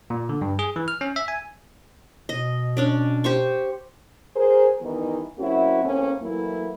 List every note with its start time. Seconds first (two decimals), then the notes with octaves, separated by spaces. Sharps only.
0.10 A#2
0.29 D3
0.41 G2
0.59 G#4
0.76 E3
0.88 F6
1.01 C#4
1.16 E5
1.28 G#5
2.29 B2 D#5
2.77 C#4 D4 D5
3.24 G4 C5 C#6
4.35 G#4 A#4 C5
4.81 D#3 E3 G3 B3 D#4
5.38 F#3 A#3 C4 C#4 E4 F#4
5.83 E2 A2 A#3 C4 C#4
6.21 E3 F#3 A3 A#3 E4